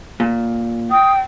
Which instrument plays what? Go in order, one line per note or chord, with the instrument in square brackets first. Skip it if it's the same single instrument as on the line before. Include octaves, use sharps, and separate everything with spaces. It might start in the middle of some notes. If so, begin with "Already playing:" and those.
[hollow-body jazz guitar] A#2
[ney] G5 [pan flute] D#6